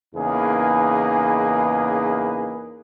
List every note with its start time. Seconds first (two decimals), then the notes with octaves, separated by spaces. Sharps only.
0.15 E2 C#3 A#3 D#4 G#4 B4